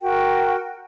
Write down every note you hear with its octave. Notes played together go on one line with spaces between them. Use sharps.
F#4 A#4 G5